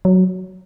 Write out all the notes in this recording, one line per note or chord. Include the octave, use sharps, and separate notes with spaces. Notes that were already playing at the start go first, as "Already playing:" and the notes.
F#3